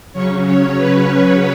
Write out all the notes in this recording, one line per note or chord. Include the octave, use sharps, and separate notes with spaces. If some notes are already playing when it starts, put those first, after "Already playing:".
C#3 F#3 C#4 C#5
C#5
B4